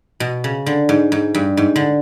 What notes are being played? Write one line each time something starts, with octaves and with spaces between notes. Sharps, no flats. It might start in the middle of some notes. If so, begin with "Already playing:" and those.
B2
C#3
D3
G#2
G#2
G2
G#2
D3